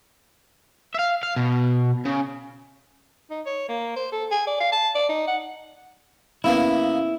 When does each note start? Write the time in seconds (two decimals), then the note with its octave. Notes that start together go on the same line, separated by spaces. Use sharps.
0.94 E5 F5
1.23 F5
1.36 B2
2.06 C#3
3.31 D#4
3.46 C#5
3.69 A#3
3.96 C5
4.12 A4
4.31 G#5
4.47 D5
4.60 F5
4.72 A5
4.95 D5
5.09 D#4
5.27 F#5
6.44 C#3 A#3 B3 E4